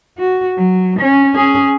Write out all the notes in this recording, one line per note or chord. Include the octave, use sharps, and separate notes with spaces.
F#4
F#3
C#4
C#4 G#4